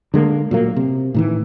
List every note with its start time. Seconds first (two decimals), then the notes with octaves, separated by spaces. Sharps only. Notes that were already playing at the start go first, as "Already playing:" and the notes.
0.14 D3 G#3 A#3
0.51 A#2 F#3 A#3
0.76 C3
1.14 A2 D#3 E3